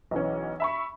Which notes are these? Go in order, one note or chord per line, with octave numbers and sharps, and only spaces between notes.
B1 E3 C#4
E5 B5 C#6